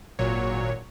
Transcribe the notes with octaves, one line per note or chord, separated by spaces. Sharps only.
G#1 A#2 F#3 C#5